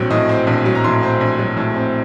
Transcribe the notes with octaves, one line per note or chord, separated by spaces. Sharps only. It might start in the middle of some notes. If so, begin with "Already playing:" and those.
Already playing: A#1 A2 F#3 C4
A2 D#5
C4
A#1
F#3
A#5
A2 C6
C4
A#1
F#3
A2
C4